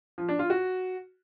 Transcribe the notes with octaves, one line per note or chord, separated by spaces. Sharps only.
F3
D4
F4
F#4